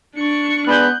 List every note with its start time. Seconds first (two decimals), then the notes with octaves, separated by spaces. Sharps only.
0.16 D4 C#6
0.67 G#3 B3 D4 F#6 G6